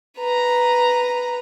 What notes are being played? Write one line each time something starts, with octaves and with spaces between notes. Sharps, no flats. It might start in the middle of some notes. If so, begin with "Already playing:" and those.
B4 A#5